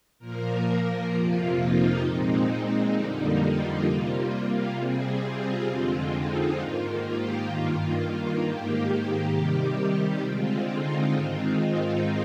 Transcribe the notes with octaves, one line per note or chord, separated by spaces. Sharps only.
A#2 F3 A#3 A#4
F2 C3 F3 A#3 F4
D#4
A#2 G#3 C4
F2 D3 G3 A#3
F4
C3 G3 A#3 F4
C3 G3 C4 G#4
F4
F2 D3 G#3 C4 F4
D#4
G#2 D#3 A#3 F4
G4
G2 D#3 A#3 F4
G#2 D#3 A#3 G4
C3 D#3 G3 G4
G4
D3 G#3 C4 F4
D#4
G#2 D#3 G#3 C4 F4
D#4